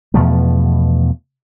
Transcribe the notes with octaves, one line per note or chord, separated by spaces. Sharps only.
E2 B2 F3 A3